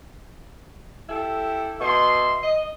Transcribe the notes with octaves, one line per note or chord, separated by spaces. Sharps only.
E4 G4 A4
B2 E5 C6
D#5